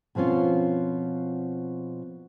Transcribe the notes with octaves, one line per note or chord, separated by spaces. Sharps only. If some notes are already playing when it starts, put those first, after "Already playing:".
B2 F3 C4 C#4 F4